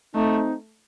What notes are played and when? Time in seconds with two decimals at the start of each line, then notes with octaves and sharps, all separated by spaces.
0.15 A3 C4 D#4